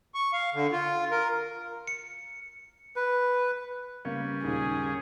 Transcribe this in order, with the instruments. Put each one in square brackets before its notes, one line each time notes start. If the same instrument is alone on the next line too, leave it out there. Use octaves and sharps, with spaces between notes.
[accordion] C#6
F5
D3
F4
A#4
[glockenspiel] C#7
[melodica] B4
[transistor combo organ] C#3 G3 C#4 [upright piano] A#3
[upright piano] D#2 A#2 D#3 [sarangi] G#4